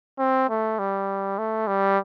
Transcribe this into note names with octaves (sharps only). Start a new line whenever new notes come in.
C4
A3
G3
A3
G3